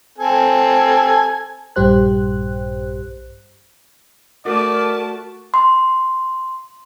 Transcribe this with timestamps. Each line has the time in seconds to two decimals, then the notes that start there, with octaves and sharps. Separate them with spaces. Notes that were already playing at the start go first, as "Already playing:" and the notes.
0.18 C4 A4 G#5
1.76 A#1 G2 G3 G4 C5 F#6
4.45 A3 F#4 A#4 D5 A5
5.54 C6